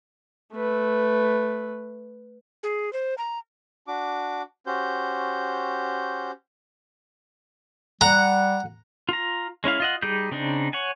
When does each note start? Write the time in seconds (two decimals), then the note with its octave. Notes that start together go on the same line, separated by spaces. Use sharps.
0.53 A3 B4
2.63 G#4
2.93 C5
3.18 A#5
3.88 D4 F#4 D6
4.66 C#4 F#4 G4 C5 G6
8.01 G3 F#5 A#5
9.09 F4 A#5
9.64 G#3 C#4 E4 F5
9.80 F4 D#5 F#5
10.02 G3 D#4 G4 G#4 G6
10.32 C#3 C4 D4 D#4
10.73 C#5 F#5 G#5